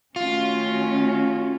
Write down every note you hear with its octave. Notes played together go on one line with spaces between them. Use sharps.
D#3 A3 C#4 F4 F#4